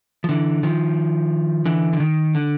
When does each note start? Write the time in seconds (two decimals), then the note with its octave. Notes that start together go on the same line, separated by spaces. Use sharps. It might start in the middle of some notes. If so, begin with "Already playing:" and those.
0.24 F3
0.29 D3 E3
0.63 D#3 F3
1.66 D3 E3
1.93 D3
2.00 D#3
2.35 D3